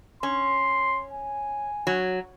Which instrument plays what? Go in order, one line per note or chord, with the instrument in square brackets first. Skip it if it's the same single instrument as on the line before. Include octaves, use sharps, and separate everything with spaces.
[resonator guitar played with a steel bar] C#4 [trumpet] C6
[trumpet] G#5
[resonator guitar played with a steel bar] F#3